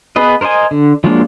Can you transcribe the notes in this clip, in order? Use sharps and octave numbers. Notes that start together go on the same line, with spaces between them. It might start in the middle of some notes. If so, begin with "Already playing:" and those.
B3 G#4 B4 D#5
A#4 C5 C#5 D#5 G#5
D3
F3 F#3 G#3 A#3 D4